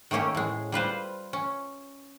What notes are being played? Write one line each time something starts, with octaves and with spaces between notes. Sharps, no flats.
D#3 A3 A#3 C#4 G4
A2 G#3
G3 F4 B4 C5
C#4